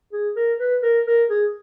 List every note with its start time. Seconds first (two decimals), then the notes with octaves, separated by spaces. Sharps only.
0.13 G#4
0.36 A#4
0.59 B4
0.83 A#4
1.07 A#4
1.30 G#4